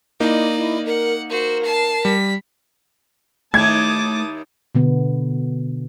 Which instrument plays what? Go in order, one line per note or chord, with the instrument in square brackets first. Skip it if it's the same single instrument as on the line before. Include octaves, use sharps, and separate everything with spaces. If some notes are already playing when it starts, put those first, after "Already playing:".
[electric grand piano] A#3 D#4 [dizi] E4 [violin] D5 D#5
[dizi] E4
[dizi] A#4 [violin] F#5
[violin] F#4 C5 [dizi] A#4
[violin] A5 C7
[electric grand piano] G3 [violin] B6
[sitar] D#2 D#3 E4 [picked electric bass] A3 [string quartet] A5 D6 D#6 [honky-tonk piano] G#6
[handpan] B2 D3 B3